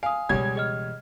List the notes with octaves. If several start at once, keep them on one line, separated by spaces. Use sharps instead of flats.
F5 G#5 D#6
C#2 B2 E3 G3 C#5 G#6
G#4 D#5 F6